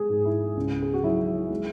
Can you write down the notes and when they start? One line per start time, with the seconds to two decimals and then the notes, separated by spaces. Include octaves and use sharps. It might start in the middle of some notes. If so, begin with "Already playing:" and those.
Already playing: G#3 G#4
0.09 G#2
0.25 E4
0.56 C#2
0.82 G#4
0.94 F#4
1.04 F#3 E4
1.50 G#3